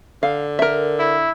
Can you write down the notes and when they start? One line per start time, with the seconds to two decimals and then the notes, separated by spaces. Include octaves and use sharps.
0.23 D3 F5
0.59 A#4 E5
0.99 E4